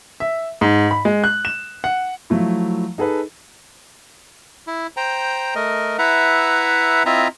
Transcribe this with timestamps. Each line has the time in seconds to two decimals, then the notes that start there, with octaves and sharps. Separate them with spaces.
0.20 E5
0.61 G#2
0.91 B5
1.05 G#3
1.24 F#6
1.45 E7
1.84 F#5
2.30 F3 F#3 A3 E4
2.98 D#4 G#4 A4 B4
4.67 E4
4.97 C5 G5 A#5
5.55 A3 A#4 D#5
5.99 E4 B4 E5 F#5 A#5
7.06 C4 E4 F4 D#5 E5 A#5